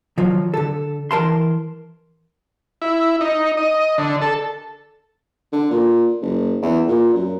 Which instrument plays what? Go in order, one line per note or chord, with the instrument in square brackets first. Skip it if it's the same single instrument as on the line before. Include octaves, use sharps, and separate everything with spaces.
[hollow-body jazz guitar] D#3 F3 F#3
D3 A4
E3 A#4 A5 C6
[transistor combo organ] E4
D#4
D#5
D3
A4
[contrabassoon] D3
A#2
F#1
E2
A#2
F#2